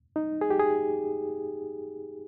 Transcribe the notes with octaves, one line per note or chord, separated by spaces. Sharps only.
D#4
G#4
G4
G#4